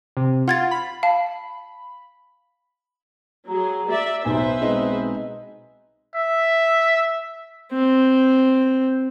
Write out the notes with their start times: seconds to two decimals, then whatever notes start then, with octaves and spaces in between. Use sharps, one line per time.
0.17 C3
0.48 F4 F#5 G#6 A6
0.71 B5
1.03 F5 A5
3.48 F#3 G#4 A#5
3.89 D5 E5
4.25 B1 D#4 B4 C5 E5 G#5
4.62 G#3 C4 D#4 G#4
6.15 E5
7.73 C4